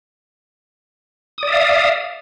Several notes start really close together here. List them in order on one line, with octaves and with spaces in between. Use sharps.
D#6 D5 E5 F5